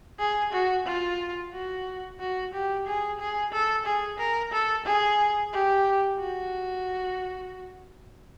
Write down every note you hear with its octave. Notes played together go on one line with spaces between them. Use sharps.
G#4
F#4
F4
F#4
F#4
G4
G#4
G#4
A4
G#4
A#4
A4
G#4
G4
F#4